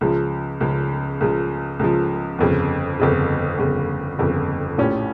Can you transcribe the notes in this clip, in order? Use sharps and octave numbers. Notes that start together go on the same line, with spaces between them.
C#2 C#3 F3
C#2 C#3 F3
C#2 C#3 F3
C#2 C#3 F3
G1 F2 C#3
G1 F2 C#3
G1 F2 C#3
G1 F2 C#3
A#1 A2 F3 C#4 G4